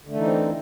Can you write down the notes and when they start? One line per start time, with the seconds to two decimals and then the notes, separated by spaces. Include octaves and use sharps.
0.05 D3
0.10 A3
0.14 E3
0.19 D#4
0.23 C4